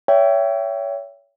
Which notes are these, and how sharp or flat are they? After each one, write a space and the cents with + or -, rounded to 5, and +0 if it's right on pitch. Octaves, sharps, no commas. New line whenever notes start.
C#5 +30 E5 +15 G5 +0